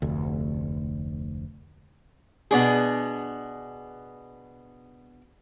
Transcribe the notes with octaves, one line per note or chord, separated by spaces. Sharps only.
F1 D2
B2 B3 D4 G#4